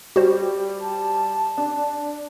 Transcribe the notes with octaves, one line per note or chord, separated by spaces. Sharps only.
G3 F#4 C5
A5
D4